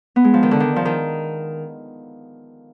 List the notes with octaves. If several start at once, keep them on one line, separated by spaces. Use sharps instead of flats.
B3
G#3
F3
D#3
D3
D#3
F3
D#3